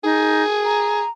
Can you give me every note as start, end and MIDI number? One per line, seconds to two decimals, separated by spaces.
0.04 0.43 63
0.04 1.02 68
0.65 1.10 82